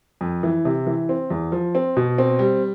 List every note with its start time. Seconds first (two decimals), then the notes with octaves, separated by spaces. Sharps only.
0.21 F2
0.43 E3
0.65 C3
0.87 E3
1.09 C4
1.31 E2
1.52 F3
1.75 C4
1.97 B2
2.18 C4
2.39 G3